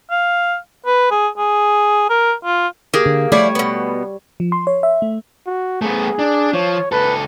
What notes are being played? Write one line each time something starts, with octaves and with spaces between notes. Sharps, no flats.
F5
B4
G#4
G#4
A#4
F4
A#3 G4 G#4
D3
F3 G3 A3 E4 C#5 D5
B2 B3
F3
C6
C#5
E5
A3
F#4
A3 B3 G#4
D4
F3 C#5
C#2 A4 B4